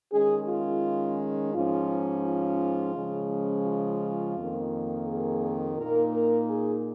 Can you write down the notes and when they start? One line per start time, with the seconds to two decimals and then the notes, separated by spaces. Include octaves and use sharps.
0.13 D#3 G#3 C#4 G#4
0.49 F4
1.54 G#2 F3 C#4 F4
2.25 F4
2.95 C#3 F3 G#3 C#4
3.66 F4
4.36 F2 D#3 A#3
5.07 G#4
5.77 A#2 A#3 D#4 A#4
6.13 A#4
6.49 G#4